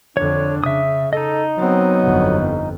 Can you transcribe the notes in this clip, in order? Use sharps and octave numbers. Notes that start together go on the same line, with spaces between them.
F2 D3 D4 C#5
C#3 E5 D#6
D#4 A4 D#5
F#3 B3 C4
G1 F2